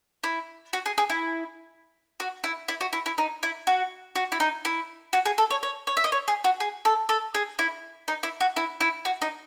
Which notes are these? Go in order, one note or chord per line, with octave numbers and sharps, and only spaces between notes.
E4
F#4
G#4
G#4
E4
F#4
E4
E4
F#4
E4
E4
D#4
E4
F#4
F#4
E4
D#4
E4
F#4
G#4
A4
C#5
C#5
C#5
E5
D#5
C#5
G#4
F#4
G#4
A4
A4
G#4
E4
D#4
E4
F#4
E4
E4
F#4
D#4